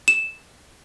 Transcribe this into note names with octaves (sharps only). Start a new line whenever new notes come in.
E7